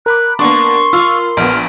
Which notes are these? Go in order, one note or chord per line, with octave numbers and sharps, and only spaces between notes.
A#4 B5 D6 F#6
A#3 B3 D4 C6 C#6
F4 E6
A#1 B3 F6